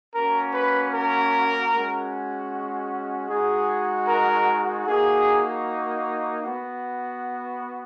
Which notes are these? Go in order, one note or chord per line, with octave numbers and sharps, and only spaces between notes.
A#3 C#4 F#4 A#4
B4
A#4
G#3 C#4 F#4
G#3 D#4 F#4 G#4
A#4
A#3 D#4 F#4 G#4
B3 F#4